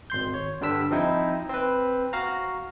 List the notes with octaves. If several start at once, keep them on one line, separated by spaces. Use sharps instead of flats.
G#1 C6 G6
C#5
G2 D3 G3 D4 E6 B6
F3 C4 D#4 E4
C4 B4
F#4 F5 A#5